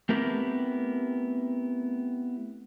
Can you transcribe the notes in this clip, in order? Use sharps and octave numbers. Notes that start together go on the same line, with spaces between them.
A3 B3 C4 E4 G4 A#4